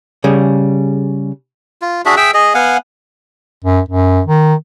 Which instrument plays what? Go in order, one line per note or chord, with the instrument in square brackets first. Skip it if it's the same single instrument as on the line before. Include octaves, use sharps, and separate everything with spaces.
[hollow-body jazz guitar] C#3 G3 G#4
[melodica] F4
D4 F#4 G#4 E5
G#4 E5 G5 E6
G#4 D#5
B3 F5 F#5 G#5
[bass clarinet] F#2
F#2
D#3